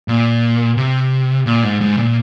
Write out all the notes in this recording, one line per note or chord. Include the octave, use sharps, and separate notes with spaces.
A#2
C3
A#2
G#2
G#2
A#2